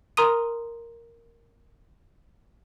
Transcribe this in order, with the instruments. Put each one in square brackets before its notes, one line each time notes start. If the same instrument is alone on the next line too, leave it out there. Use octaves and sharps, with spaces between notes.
[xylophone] A#4 A#5 C6 D#6 D#7